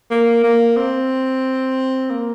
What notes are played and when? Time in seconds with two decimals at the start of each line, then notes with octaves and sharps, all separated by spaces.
0.10 A#3
0.44 A#3
0.77 C4
2.10 A#3